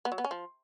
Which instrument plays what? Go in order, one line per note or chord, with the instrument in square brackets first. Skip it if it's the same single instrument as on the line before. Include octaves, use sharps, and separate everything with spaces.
[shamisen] B3
F#3
B3
C#4
F3